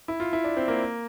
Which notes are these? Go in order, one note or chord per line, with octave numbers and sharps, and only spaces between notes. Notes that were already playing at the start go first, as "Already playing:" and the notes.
E4
F4
E4
D4
C4
A#3